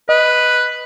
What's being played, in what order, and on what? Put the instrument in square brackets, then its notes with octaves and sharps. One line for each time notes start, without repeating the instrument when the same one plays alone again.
[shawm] B4 [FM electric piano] D#5